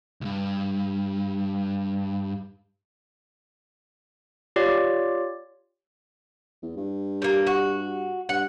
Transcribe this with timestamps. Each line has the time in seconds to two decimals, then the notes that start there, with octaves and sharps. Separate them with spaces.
0.21 C2 G2
4.56 F4 G4 C#5 D5
6.63 E2
6.77 G2
7.22 G3 A#3
7.47 F#4
8.29 G2 F#5